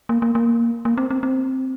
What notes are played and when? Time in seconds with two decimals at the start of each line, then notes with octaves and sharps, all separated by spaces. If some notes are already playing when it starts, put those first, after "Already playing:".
0.09 A#3
0.22 A#3
0.35 A#3
0.85 A#3
0.98 C4
1.11 C4
1.23 C4